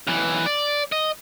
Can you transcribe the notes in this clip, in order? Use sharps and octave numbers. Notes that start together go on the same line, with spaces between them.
B1 E3
D5
D#5